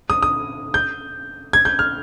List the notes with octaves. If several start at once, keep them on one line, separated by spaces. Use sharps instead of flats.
D#6
D#6
G6
G#6
G6
F6